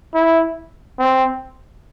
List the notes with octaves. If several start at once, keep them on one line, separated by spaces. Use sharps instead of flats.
E4
C4